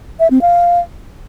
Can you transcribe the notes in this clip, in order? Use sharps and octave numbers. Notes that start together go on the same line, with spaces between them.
E5
C4
F5